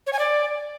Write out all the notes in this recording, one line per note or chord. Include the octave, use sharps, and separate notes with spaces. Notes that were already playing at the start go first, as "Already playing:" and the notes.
C#5
G#5
D5